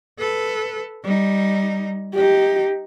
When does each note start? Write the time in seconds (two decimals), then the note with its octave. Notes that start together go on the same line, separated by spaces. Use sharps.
0.19 A4 B4
1.03 G3 D#4
2.15 D#4 G4